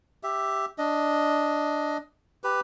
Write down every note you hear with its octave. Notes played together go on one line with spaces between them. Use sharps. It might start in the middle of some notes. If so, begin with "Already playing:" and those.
G4 E5
D4 D#5
G4 B4